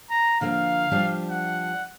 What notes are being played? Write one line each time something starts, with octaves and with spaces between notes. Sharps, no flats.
A#5
D3 F3 A#3 F5
F3 G3 D4
F#5